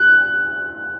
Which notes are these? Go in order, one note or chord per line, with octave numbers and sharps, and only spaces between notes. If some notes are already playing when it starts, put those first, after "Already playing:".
Already playing: F#6